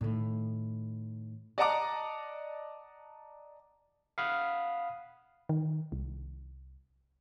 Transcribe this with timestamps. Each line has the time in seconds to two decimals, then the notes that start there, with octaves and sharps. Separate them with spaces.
0.01 A2 D#3
1.58 D5 D#5 F#5 A5 A#5 D6
4.18 F5 F#5 B5 D#6 F6
5.49 D#3
5.92 C2